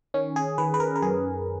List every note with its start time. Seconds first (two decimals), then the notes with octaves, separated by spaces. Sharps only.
0.14 D#3 C#4
0.36 G#4
0.58 D#3 B4
0.74 B4
0.80 A#4
0.95 A#4
1.02 F#2 G#4